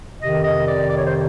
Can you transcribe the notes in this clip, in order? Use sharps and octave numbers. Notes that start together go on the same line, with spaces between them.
F2 C3 D#3 D#5
D#5
D5
D5
C#5
C5